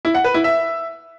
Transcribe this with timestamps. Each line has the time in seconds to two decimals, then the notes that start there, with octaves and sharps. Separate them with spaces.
0.05 E4
0.15 F#5
0.24 B4
0.34 E4
0.44 E5